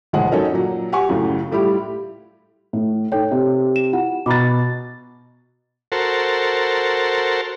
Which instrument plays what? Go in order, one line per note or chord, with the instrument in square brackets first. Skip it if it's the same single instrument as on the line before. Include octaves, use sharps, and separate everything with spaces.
[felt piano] E1 A#1 D#3 G#3 F#5
F#3 C#4 D#4 A4 A#4
A#2 F#3
G4 F#5 G#5 C#6
C#2 F#2 A2 C#3
A2 G3 E4 F4 G4
A2
[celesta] D#4 A4 C#5 [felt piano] G5
[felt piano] C3
[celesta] E7
E4 F4 F#5
[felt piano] B2 A6 [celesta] A#5 B5 D6
[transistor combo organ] F#4 A4 A#4 C5